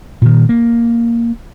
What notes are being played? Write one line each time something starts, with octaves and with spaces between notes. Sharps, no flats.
A#2 D#3
A#3